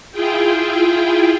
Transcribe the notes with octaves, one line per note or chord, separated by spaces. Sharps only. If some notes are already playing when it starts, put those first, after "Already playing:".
E4 F4 G#4 G5